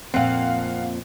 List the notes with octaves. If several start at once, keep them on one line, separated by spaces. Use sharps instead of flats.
F2 A#2 C4 F5 F#5